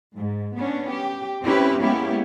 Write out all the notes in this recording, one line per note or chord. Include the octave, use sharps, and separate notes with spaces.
G#2
B3 C#4 D4
G4
C4 C#4 E4 G4 B4
G#3 A#3 B3 C#4 E4 G4